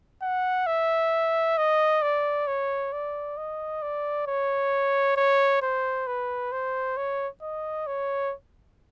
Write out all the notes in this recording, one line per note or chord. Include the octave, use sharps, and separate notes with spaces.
F#5
E5
D#5
D5
C#5
D5
D#5
D5
C#5
C#5
C5
B4
C5
C#5
D#5
C#5